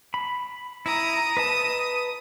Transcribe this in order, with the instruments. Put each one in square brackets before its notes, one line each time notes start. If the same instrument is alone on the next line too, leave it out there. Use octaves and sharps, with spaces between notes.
[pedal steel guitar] B5
[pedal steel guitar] E4 [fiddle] A#5 D#6
[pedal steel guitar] B4 D#5 A5 [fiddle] D#6